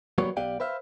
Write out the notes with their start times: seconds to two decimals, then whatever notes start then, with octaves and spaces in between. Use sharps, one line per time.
0.18 F#3 G3 A#3 B3 C#5
0.37 B1 B3 G4 D5 F5 G5
0.60 B4 C5 E5 F5